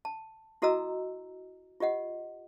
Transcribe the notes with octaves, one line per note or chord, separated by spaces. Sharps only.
A5
E4 F#4 A4 D#5 A#5 E6
F4 G4 D#5 F#5